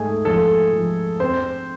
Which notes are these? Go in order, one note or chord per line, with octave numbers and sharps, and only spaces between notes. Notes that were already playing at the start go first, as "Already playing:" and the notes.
Already playing: G#2 A3 G#4
F3 A4
F3
C4 C5